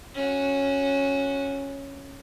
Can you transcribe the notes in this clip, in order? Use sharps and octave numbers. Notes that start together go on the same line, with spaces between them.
C#4 F#4